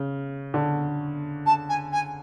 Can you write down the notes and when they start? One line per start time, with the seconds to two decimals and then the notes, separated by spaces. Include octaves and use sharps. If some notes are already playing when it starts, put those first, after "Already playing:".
Already playing: C#3
0.54 D3
1.46 A5
1.69 G#5
1.92 G#5